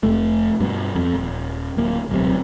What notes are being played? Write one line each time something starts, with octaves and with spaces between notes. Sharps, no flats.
F1 A3
G2 B2
F2
D#1
D1 A#3
D1 B1 C3